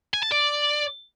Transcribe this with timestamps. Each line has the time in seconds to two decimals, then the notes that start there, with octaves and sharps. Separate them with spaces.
0.14 G#5
0.23 A5
0.32 D5